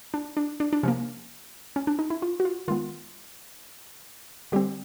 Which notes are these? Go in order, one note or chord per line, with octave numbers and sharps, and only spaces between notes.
D4
D4
D4
D4
C3 F3 A#3 C#4
C#4
D4
D#4
E4
F4
F#4
F4
D#3 G#3 B3 F4
D3 G3 C4 G4